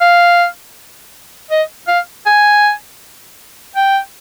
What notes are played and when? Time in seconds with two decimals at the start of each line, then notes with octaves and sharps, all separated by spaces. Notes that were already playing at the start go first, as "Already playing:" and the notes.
0.01 F5
1.51 D#5
1.88 F5
2.26 G#5
3.76 G5